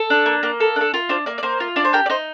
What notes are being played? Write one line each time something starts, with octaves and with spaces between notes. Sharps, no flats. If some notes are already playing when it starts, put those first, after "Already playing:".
Already playing: A4
D4
A#3
A#3
A4
D4 A4
F4 A#4
D4 C5
A#3 D5
D5
A#3 C5
F4
D4 D5
C5
G4 A#4
D5
D#4 C5